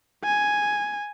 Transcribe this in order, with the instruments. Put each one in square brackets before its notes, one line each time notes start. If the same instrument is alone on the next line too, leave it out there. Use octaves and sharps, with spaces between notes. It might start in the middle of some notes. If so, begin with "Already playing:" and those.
[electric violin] G#5